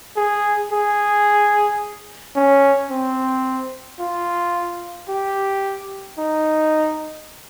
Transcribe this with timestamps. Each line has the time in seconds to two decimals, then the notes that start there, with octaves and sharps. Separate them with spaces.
0.17 G#4
0.72 G#4
2.36 C#4
2.90 C4
3.99 F4
5.08 G4
6.18 D#4